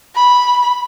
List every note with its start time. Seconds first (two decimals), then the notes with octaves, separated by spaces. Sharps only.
0.15 B5